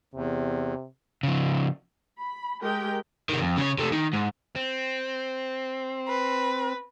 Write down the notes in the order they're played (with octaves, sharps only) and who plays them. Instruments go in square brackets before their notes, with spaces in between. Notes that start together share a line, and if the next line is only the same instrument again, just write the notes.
[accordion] E2 [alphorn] C3
[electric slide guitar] C#3 F3
[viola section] B5
G#3 G4 A#4 G5
[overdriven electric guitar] C3 D#3
F2
C#3 C#5
C3 A3
D#3
G#2
C4
[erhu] B4